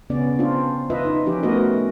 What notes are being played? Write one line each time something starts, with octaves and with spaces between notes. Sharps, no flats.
C#3 B3 C#4 D5
C4 D4 F4
F4 B4 D#5 E5
D#4
F3 C#4 G4
A3 B3 F#4 A#4 B4 D#5